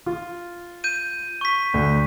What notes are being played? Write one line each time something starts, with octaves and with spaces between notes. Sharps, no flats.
F4
G6 D#7
C#6 B6
D2